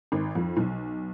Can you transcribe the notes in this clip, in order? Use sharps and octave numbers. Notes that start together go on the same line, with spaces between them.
G#1
F2
B1